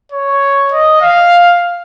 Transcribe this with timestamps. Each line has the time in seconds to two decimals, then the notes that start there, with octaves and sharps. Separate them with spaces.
0.12 C#5
0.72 D#5
1.01 F5